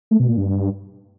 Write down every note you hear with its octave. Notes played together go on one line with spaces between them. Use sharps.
A3
B2
A#2
G2